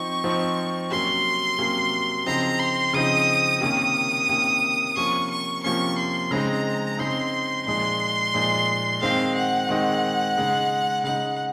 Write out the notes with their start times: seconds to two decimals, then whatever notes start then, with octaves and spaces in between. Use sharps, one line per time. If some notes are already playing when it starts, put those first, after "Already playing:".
Already playing: F3 C4 D#4 C#6
0.24 F3 C4 D#4
0.91 C3 F#3 A#3 C#4 C6
1.58 C3 F#3 A#3 C#4
2.26 C#3 F3 C4 D#4 A#5
2.59 C6
2.93 C#3 F3 C4 D#4 D#6
3.61 C3 D#3 A#3 C#4 D#6
4.29 C3 D#3 A#3 C#4
4.96 C3 F3 A#3 C#4 C#6
5.30 C#6
5.64 C3 F3 A#3 C#4 C#6
5.98 C6
6.31 C#3 G#3 C4 D#4 A#5
6.99 C#3 G#3 C4 D#4 C6
7.66 A#2 F3 G#3 D#4 C6
8.34 A#2 F3 G#3 D#4
9.02 D#3 G#3 C4 D#4 F5
9.35 F#5
9.69 D#3 G#3 C4 D#4
10.37 C#3 G#3 D#4
11.04 C#3 G#3 D#4 F#5